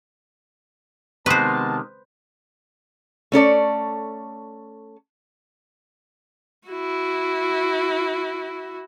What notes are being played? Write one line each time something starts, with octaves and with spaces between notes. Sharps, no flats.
C3 D#3 G#3 B3 B4 C5 A5
A3 C#4 A4 D5
E4 F#4